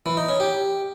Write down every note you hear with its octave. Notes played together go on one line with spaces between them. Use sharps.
E3
D#4
C#4
G4